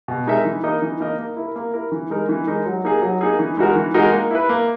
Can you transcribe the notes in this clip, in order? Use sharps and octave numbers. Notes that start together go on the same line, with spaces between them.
B2
G#3 D#4 A#4 E5
E3
A#3 D#4 A#4 D#5
E3
A#3 D#4 A#4 D#5
A#3
E4 A#4
A#3
E4 A#4
E3
G#3 D#4 A#4
E3
G#3 D#4 A#4
F#3
A#3 D#4 G#4
F#3
A#3 D#4 G#4
E3
G#3 D#4 F#4 A#4
E3
G#3 D#4 F#4 A#4
A#3
E4 B4
A#3